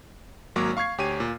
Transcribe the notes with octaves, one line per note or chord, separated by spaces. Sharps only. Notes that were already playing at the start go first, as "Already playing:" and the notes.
G#1 F#3 A#3 C#5 D6
F5 C#6 F6 G#6 C7
D2 G4 C#5 G#5 D#7
A#2